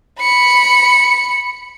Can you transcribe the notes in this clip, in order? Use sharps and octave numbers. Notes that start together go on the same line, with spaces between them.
B5 C#7